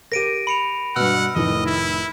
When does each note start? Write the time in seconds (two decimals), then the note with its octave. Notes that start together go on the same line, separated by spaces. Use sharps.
0.12 G4 A#4 A#6 D7 D#7
0.47 B5 C#7 F7
0.96 G2 B2 F#5 E6 F6
1.35 F1 A2 D#3 D#5
1.66 E4